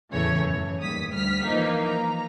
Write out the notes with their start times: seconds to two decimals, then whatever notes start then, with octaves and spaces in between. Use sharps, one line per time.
0.11 E2 A2 C#3 E3 A3 C#5
0.40 F#2 E3
0.79 D#2 G3 D#6 B6
1.10 D2 G3 F6 B6
1.45 E3 F3 A#3 D#4
1.83 A#5